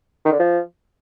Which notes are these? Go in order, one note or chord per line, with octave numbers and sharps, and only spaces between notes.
D#3
D3
F3